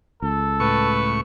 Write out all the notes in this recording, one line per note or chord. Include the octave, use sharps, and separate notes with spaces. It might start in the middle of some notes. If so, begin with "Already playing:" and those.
C#2 A4
A2 B4 C#6